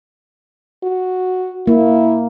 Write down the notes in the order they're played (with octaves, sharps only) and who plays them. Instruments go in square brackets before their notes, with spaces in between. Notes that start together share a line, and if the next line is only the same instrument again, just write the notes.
[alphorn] F#4
[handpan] A#3 [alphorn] E4